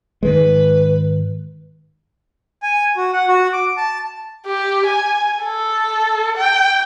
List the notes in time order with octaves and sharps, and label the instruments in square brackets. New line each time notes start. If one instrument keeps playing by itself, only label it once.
[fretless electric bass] G#2 D#3 G#3 [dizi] B4
[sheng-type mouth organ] G#5
F#4
F#5
F#4
D6
A5
[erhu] G4
G#5
A4
G5